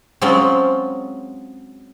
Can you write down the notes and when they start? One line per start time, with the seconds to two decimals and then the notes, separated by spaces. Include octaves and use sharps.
0.21 F#3 G#3 C4 C#4 F4